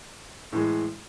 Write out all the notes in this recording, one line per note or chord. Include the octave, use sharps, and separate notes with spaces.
A2 E3 G#3